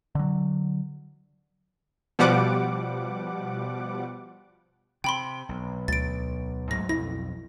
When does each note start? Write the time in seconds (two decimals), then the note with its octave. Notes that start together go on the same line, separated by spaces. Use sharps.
0.15 D3 F#3
2.19 B2 F3 G3 F#5 D6
5.04 C3 G5 B5 C6
5.49 B1
5.88 D2 A6 D7
6.71 G#2 F#3 A3 A#6
6.89 B1 F2 E4 A#6